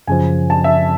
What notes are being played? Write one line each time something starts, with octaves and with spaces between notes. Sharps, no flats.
F#2 C#3 F3 G#5
A5
E5